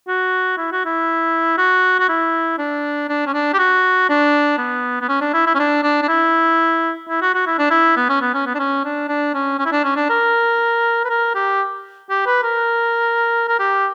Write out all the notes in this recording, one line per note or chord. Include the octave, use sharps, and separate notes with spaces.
F#4
E4
F#4
E4
F#4
F#4
E4
D4
D4
C#4
D4
G4
F#4
D4
B3
B3
C#4
D4
E4
E4
C#4
D4
D4
D4
E4
E4
F#4
F#4
E4
D4
E4
B3
C#4
B3
C#4
B3
D4
C#4
D4
D4
C#4
C#4
E4
D4
C#4
D4
A#4
B4
A#4
G4
G4
B4
A#4
A#4
G4